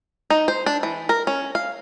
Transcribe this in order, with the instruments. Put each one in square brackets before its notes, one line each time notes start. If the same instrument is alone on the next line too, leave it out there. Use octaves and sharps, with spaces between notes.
[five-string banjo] D#4
C5
D4
E3
A#4
C#4
F5